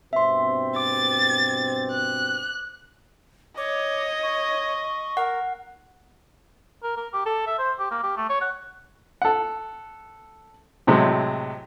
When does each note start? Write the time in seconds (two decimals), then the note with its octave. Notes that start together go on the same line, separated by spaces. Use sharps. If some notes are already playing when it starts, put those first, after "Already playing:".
0.13 G2 B2 C4 E5 C6
0.76 D6 A6
1.92 F#6
3.57 C#5 D#5 D6
4.23 C#6
5.17 A#4 F#5
6.83 A#4
6.97 A#4
7.13 G4
7.26 A4
7.47 E5
7.59 C5
7.79 G4
7.91 A#3
8.03 G4
8.17 A3
8.29 C#5
8.41 F#5
9.22 A4 F#5
10.87 A2 C3 F#3 G#3